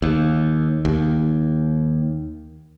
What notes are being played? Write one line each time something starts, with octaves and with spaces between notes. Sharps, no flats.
D#2
D#2